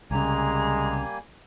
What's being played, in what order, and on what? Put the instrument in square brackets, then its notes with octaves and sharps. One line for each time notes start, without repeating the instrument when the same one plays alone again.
[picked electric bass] C2 C#3 [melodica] G3 A#3 G#5 [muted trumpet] G#3 [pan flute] A#5